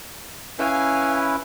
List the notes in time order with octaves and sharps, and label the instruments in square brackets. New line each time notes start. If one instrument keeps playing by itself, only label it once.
[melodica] C#4 E4 B4 [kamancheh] F5 G#5